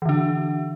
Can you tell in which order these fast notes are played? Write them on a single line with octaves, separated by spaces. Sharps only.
E3 D3 D4